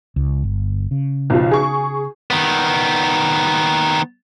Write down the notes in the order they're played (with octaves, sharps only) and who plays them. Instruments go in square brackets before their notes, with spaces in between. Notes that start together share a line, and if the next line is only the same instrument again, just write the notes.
[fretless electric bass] C#2
G1
C#3
[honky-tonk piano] B1 F3
G#4 C#6
[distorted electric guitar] D#3 B3